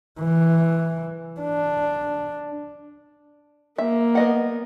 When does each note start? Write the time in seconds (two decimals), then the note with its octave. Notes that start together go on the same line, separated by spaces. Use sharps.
0.20 E3
1.41 D4
3.78 A#3 E5
4.15 B3 D#5 F#5